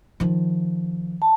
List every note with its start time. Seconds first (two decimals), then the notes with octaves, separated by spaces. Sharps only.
0.20 D#3 F3
1.22 A5